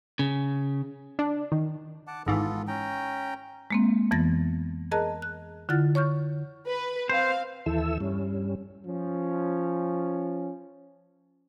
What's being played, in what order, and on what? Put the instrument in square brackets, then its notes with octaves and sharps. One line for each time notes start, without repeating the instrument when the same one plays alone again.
[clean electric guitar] C#3
[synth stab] D4
D#3
[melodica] F#5 A5 D6
[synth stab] G#1 G#2 E3 [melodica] B3 F4 A4
[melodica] C#4 G5 A#5
[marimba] G#3 A#3 C4
F2 E3 B3 A6 A#6
G#4 A#4 D#5 A5 A#5 F#6
F#6
D3 E4 F4 F#5 F6 A6
C#5 C#6 F6 G6
[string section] B4
[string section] C4 F5 [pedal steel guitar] C5
[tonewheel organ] D#2 E3 E4 A4 E6
G2 G3 C#4
[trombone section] F3 C#4